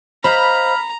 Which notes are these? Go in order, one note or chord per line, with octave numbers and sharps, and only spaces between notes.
C5 D#5 F5 A#5 B5 F6